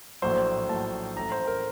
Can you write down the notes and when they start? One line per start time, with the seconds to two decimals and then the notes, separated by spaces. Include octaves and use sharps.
0.22 A#1 A2 F#3 C5
0.69 A#1 A2 F#3 A5
1.16 A1 A2 A3 A#5
1.32 C5
1.47 A#4